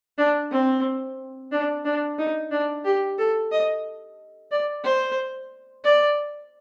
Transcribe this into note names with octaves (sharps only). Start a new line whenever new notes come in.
D4
C4
D4
D4
D#4
D4
G4
A4
D#5
D5
C5
D5